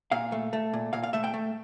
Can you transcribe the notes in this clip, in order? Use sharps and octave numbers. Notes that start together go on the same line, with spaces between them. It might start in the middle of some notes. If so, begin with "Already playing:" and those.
A#2 F5
A3
A3
A#2
A#2 F5
F5
A3 E5
G5
A3